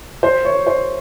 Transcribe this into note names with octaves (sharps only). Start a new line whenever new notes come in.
C5
C#5
C5